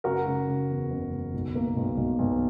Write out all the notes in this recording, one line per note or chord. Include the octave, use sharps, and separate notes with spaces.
F#1 F#4 A#4
C#3
C#3
E2
F#1
F#1
B1
A#3
B1
B1
B1